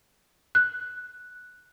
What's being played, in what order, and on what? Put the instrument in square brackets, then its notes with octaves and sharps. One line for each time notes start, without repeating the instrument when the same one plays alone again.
[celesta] F#6